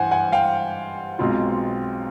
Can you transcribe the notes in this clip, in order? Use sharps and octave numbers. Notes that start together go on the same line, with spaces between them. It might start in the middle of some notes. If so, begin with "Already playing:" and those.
Already playing: G2 E3 G3 C5 F#5 G#5
F#5 G#5
F5 G5
B1 B2 G#3 C4 F4